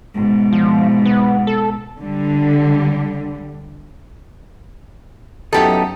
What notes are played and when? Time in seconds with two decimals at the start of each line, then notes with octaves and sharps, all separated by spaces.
0.14 G#2 B2
0.52 F3
1.06 B3
1.47 A4
1.99 D3 G3
5.53 F#2 B3 D#4 E4 G4 A4